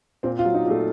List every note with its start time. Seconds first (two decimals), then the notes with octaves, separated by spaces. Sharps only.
0.23 A#2 C4
0.39 F4
0.45 F#3
0.54 D#4
0.65 A#2 A3